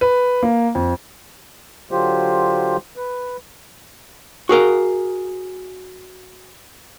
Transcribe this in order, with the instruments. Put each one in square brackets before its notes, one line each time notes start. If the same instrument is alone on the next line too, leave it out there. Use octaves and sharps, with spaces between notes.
[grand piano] B4
A#3
F2
[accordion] D3 F#3 F4 G4 C5
B4
[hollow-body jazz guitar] F#4 G#4 A#4 F5